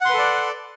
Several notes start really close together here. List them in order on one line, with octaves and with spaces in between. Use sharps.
F#5 C6 B4 A4 D5